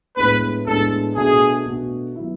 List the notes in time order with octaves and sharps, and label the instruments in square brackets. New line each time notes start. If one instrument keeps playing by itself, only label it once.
[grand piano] A2 G#3 B3 D4 [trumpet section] B4
[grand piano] A2 G#3 B3 D4 [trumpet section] A4
[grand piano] B2 A3 D4 F#4 [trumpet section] G#4
[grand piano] B2 A3 D4 F#4
F#3 B3 E4